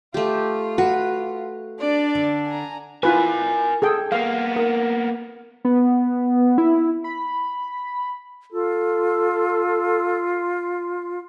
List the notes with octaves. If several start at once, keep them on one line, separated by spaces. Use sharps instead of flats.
A3 F4 G4
F#4 B4
D4 D5
D3
G#5 A#5
E4 F4 A#4 B4 G#5
G#4 A4 G5
A#3 B3 F5
A#4
B3
E4
B5
F4 A4